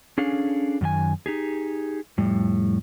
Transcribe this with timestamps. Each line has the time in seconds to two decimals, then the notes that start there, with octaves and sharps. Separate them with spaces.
0.18 C#4 D4 G#4 A4 F5
0.81 F#2 D#3 F4 G#5
1.26 D#4 G4 G#4
2.18 F2 A2 G3